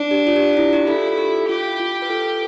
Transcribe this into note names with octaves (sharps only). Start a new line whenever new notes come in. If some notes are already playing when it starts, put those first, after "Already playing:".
Already playing: D4
G4
F4
G4
F4
F4
E4
G4
E4 F4 A4
A4
G4
F4 G4
F4
B4
F4 A4